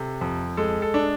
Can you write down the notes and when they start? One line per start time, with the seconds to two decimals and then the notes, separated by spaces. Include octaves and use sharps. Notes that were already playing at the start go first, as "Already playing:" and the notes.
Already playing: C3 A4
0.21 F2
0.57 G#3 A4
0.82 A4
0.94 D4